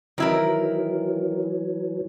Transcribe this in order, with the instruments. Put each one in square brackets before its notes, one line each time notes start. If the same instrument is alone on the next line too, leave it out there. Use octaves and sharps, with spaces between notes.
[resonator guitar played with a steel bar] D#3 E4 A#4 [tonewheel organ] E3 F#3